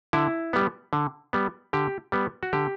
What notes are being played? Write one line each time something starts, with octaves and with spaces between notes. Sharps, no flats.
D3 E4
G3 B3
D3
G3 B3
D3 G4
G3 B3
F#4
D3 G4